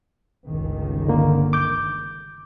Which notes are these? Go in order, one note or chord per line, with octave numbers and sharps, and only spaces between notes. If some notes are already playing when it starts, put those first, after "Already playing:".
G1 C#2 D#3
D3 A#3
D6 G6